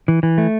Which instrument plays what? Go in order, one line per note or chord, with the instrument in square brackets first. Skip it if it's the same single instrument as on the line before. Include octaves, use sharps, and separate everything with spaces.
[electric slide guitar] E3
E3
A3